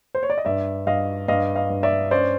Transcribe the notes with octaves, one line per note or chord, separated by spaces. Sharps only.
C5
C#5
D5
D#5
G2 D5 E5
G2 D#5 F5
G2 D#5 F5
D#5 F5
G2
D5 E5
C#4 C5 D5